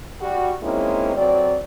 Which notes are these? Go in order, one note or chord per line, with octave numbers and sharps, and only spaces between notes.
G3 F#4
G#3 A#3 C4 C#4 D#4 E4
F2 F#3 C4 D5